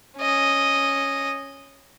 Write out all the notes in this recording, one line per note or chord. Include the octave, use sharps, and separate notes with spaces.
C#4 D#5